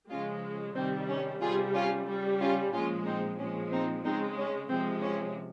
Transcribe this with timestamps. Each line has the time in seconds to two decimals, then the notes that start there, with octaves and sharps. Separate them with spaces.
0.11 C#3 F3 G#3 C#4 F4
0.76 C3 D#3 G3 C4
1.09 C#4
1.42 C3 G3 F4 G#4
1.74 C#4 F4
2.08 C#3 G3
2.40 C#4 F4
2.73 A#2 F3 G#3 C#4 F4
3.06 C4 D#4
3.39 A#2 F3 G#3 C#4
3.72 C4 D#4
4.05 C#3 G#3 C4 D#4
4.38 C#4
4.70 C3 F3 G#3 C4
5.03 C#4